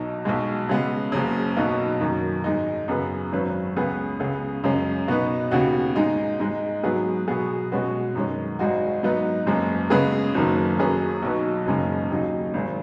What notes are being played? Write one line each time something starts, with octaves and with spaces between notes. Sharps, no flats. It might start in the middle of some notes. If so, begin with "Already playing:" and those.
Already playing: B1 B2 F#3 D#4
B1 B2 G#3
C#3 G#3 B3
F#1 F#2 C#3
B1 B2 F#3 B3 D#4
F#2 D#3 F#3
G#2 G#3 D#4
F#2 C#3 B3 G#4 B4
G#1 F#2 F#3 C#4 B4
C#2 C#3 B3 G#4 B4
C#2 C#3 B3 G#4
F#2 C#3 G#3 C#4
B2 B3 D#4 B4
D#2 C#3 B3 F#4
G#2 G#3 D#4
G#2 G#3 D#4
G#2 F#3 B3 G#4 B4
B2 F#3 B3 G#4
B2 G#3 C#4 F#4 B4
F#2 D#3 G#3 C#4
G#1 G#2 G#3 D#4 F#4
G#2 F#3 B3 D#4 B4
F#1 F#2 C#3 G#3
C#3 G#3 B3 G#4 B4
F#1 F#2 D#3 F#3
F#2 F#3 C#4 G#4 B4
B1 B2 F#3 D#4 B4
F#1 F#2 C#3 G#3 D#4
D#2 C#3 F#3 D#4
G#1 G#2 D#3 G#3